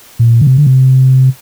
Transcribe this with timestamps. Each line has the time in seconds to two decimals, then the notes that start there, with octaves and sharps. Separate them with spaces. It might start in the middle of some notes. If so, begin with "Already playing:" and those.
0.19 A#2
0.41 D3
0.47 C3
0.58 D3
0.67 C3